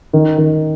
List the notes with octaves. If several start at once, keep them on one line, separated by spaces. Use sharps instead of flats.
D#3
D#3